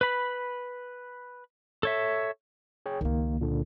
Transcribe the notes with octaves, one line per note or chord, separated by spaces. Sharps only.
B4 B5
A4 C#5 E5
G#4 C#5 G5
C#2 D#3 A#3 C#4
A#2 D3